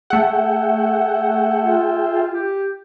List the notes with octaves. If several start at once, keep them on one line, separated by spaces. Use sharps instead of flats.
A3 G#4 E5 F#5 G5
F4
G4